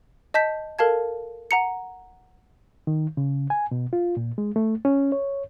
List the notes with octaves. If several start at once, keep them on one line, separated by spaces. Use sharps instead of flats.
D#5 A5 G6 B6
A4 A#4 F5 A5 G#6
F#5 A#5 C#7
D#3
C#3
G#5
B2
F4
A#2
G#3
A3
C#4
C#5